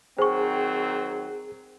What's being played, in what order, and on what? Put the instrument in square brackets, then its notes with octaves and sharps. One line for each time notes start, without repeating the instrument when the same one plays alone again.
[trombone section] D#3 F#3 C4 [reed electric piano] G#4 [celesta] C5 C#6